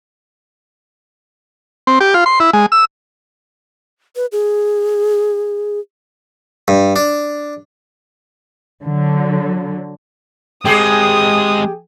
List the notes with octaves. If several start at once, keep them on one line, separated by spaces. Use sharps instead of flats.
C4
G4
F4
C6
E4
G#3
E6
B4
G#4
G2
D4
D3 F#3
G#3 C4 G4 G#4 D#6